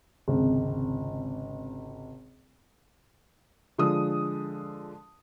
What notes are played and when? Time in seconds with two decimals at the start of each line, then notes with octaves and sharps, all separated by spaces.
0.28 G#1 C#2 C3
3.78 D3 F3 G#3 D#6